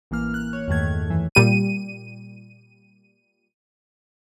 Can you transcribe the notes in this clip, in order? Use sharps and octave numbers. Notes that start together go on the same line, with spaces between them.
A1 E3 A#3 F6
F#6
C#5
E2 G2 D#3 A3 G#6
F#2 E3
A#2 G3 D#7